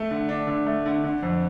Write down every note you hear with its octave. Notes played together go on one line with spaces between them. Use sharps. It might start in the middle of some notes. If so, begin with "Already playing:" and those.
Already playing: A3
D3
D4
D3
A3
D3
D3
F2